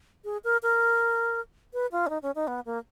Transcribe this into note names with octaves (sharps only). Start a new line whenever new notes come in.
G#4
A#4
A#4
B4
F4
C#4
D#4
C#4
D#4
B3
A#3